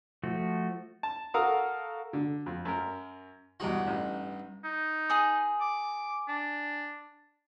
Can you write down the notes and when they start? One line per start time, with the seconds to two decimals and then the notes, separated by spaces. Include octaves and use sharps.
0.23 F3 A3 F#4
1.03 A5
1.34 F#4 A4 A#4 F5 A#5 D#6
2.13 D3
2.46 F2
2.65 F#2 A#4
3.60 E2 G2 D#4 F#4 F#5
3.87 A1
4.64 D#4
5.10 G#4 D#6
5.61 D6
6.29 D4